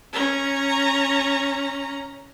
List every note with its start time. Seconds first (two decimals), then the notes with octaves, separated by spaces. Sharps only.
0.13 C#4 A#5